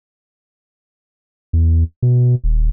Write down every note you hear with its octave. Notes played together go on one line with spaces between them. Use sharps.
E2
B2
D#1